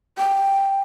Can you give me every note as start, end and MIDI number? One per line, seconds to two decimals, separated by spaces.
0.18 0.82 79